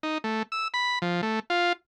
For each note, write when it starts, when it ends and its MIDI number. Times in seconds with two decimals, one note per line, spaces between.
0.03 0.18 63
0.24 0.43 57
0.52 0.68 88
0.74 0.99 83
1.02 1.21 53
1.23 1.40 57
1.50 1.73 65